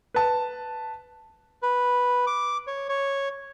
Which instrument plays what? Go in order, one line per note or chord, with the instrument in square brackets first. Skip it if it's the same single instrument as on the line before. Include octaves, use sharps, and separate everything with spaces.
[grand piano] B4 A5
[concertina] B4
D6
C#5
C#5